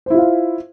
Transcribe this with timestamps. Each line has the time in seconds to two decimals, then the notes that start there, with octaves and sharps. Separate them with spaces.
0.06 C5
0.10 E4
0.14 F4
0.19 F5